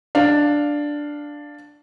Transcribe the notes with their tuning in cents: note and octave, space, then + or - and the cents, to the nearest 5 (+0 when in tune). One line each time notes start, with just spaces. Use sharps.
D4 +0 F5 +0